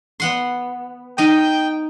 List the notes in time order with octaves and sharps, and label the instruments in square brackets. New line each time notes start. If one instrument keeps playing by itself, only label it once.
[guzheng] B3 F#5 C6
[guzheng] D#4 D#5 [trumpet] G5